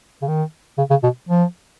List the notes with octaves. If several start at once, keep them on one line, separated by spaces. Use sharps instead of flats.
C#3
D#3
C#3
C#3
B2
F3